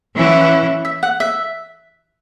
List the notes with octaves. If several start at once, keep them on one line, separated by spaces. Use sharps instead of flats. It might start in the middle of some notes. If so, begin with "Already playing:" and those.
E3 C#4 E4
F#5
E5
F#5
E5
F#5
E5